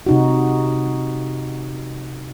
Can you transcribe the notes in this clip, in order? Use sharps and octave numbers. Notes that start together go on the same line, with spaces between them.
C3 D#4 F#4